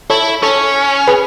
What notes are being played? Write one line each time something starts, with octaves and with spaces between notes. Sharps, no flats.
E4 A4 C#5
C#4 A4 C#5
G#4 B4